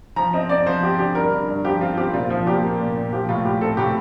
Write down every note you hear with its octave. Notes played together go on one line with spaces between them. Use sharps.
F3 A#5
C4 D#5
C4 D5
F3 C5
C4 G4
D3 G4
G2 A#4
G2
G2
F3 G4
C4 F4
C4 G4
A#2 F4
F3 F4
A#2 G4
A#3
A#2
A#2
F3 G4
A2 F4
A2 G4
C4 A4
A2 G4